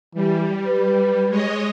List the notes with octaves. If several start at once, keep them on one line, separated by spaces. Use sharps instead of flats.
E3 G3
B4
G#3 C#5 D#5